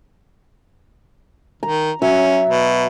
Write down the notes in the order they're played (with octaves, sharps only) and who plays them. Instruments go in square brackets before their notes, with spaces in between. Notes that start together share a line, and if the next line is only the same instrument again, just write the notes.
[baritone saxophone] D#3 [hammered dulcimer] A#5
[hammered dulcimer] F#3 E5 [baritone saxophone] C#4
[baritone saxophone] B2